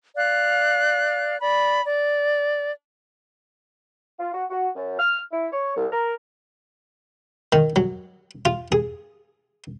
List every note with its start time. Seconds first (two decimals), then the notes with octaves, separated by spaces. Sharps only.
0.16 D5 F5 F#6
1.40 D5 B5
1.84 D5
4.19 F4
4.33 F#4
4.50 F#4
4.76 F#2
4.99 F6
5.32 E4
5.52 C#5
5.76 C2
5.92 A#4
7.52 D#3
7.76 F#3
8.45 F4
8.72 G#4